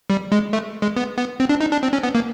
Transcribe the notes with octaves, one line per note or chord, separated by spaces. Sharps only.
G3
G#3
A3
G#3
B3
B3
C4
D4
D#4
D4
C4
C#4
B3
A#3